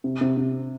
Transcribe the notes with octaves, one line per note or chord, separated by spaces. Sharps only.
C3
C3
C3